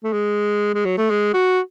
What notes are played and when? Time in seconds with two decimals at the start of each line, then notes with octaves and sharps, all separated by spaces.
0.04 A3
0.13 G#3
0.75 G#3
0.85 F#3
0.98 A3
1.10 G#3
1.34 F#4